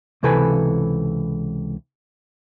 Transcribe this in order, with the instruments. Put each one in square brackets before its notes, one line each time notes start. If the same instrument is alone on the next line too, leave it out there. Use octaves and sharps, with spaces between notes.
[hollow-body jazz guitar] C#2 C3 E3 A4 B4 G#5